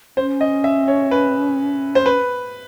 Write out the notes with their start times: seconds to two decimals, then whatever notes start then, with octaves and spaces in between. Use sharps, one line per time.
0.17 C#4 C5
0.41 D#5
0.64 E5
0.88 C#5
1.11 B4
1.95 C5
2.06 B4